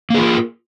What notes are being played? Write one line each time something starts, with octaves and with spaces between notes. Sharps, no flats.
A#3 F4 G#4 A#4